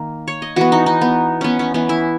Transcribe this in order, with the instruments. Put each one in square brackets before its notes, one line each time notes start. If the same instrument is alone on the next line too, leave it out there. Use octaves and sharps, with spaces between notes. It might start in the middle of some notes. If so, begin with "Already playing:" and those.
Already playing: [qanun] D#3 A#3
C#5
D#5
E3 B3 F#4
D#4
D#4
B3
B3 C#4
C#4
E3 B3 C#4
E4